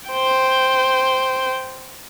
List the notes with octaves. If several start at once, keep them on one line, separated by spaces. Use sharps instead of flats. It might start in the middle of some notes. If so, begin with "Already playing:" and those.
C5 G5